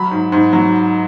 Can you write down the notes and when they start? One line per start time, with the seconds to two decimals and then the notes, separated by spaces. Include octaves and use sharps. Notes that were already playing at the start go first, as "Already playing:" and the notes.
Already playing: F#3 B5
0.11 G#2
0.32 G#2
0.53 F#3